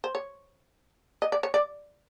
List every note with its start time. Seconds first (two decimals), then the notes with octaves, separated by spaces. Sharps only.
0.04 C5
0.15 C#5
1.22 D#5
1.32 D5
1.43 C#5
1.54 D5